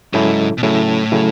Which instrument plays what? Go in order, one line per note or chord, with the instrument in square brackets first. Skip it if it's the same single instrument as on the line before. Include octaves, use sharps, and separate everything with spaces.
[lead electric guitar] G#2 [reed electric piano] C#3 F#3 C#4 E4 A4
[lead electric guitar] B2
[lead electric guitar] A2 [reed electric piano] C#3 F#3 C#4 E4 A4
[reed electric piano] C#3 F#3 C#4 E4 A4